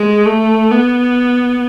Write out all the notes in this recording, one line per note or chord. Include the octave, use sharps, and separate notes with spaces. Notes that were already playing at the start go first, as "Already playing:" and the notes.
Already playing: G#3
A3
B3